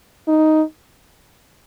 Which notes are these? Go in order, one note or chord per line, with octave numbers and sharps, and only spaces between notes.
D#4